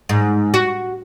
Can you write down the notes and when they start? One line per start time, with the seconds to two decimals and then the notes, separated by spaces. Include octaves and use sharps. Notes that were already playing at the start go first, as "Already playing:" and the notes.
0.09 G#2
0.54 F#4